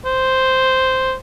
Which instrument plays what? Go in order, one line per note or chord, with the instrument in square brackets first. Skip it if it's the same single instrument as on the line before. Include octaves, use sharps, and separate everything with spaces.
[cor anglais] C5